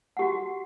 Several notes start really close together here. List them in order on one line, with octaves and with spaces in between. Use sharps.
F#5 G4 F#4